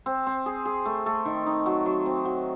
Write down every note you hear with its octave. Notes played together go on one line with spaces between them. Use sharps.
C4
C4
G#4
G#4
A3
A3
D#3
D#4
F#3
F#3
C4
F#3